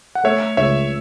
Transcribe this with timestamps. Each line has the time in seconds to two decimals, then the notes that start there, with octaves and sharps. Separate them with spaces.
0.15 F#5
0.24 A3 C#5 E5
0.57 C#2 C#5 E5